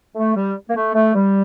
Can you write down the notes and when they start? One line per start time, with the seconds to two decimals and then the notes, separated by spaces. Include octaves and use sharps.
0.16 A3
0.35 G3
0.69 A#3
0.76 A3
0.94 A3
1.15 G3